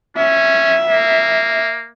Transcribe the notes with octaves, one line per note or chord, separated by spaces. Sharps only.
C#4 E5
A#3